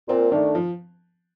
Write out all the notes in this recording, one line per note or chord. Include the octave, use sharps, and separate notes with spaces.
A#2 C4
D#3 A3 D4
F3